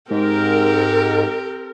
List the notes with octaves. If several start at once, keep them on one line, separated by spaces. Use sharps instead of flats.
G#2 C4 G4 A#4